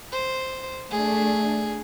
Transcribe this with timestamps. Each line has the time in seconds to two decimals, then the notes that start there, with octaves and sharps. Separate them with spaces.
0.12 C5
0.91 A3 D4 G#4